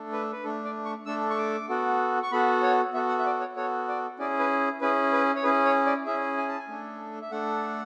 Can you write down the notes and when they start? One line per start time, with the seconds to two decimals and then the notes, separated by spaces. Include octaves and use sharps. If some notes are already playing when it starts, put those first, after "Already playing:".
Already playing: A3 D4 A4
0.13 B4
0.32 B4
0.44 A3 D4 A4
0.64 D5
0.85 C#6
1.06 A3 D4 A4 E6
1.30 C#6
1.38 D6
1.69 B3 F#4 A4
2.23 C#6
2.32 B3 F#4 A4 B5
2.63 C#5
2.94 B3 F#4 A4 E5
3.09 F#5
3.19 E5
3.26 D5
3.40 C#5
3.56 B3 F#4 A4 C#5
3.88 D5
4.19 C#4 E4 G#4 D5
4.39 B4
4.81 C#4 E4 G#4 B4
5.13 B4
5.36 C#5
5.44 C#4 E4 G#4 B4
5.65 C#5
5.86 D5
6.06 C#4 E4 G#4 E5
6.37 G#5
6.48 A5
6.58 G#5
6.68 A3 D4 A4
7.22 E5
7.31 A3 D4 A4 F#5